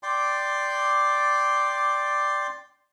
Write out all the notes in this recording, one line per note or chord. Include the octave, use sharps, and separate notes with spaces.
D5 G5 C6 D6